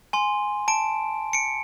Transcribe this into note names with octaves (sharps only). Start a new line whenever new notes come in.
G#5 C6
A5 D7
C#7 D7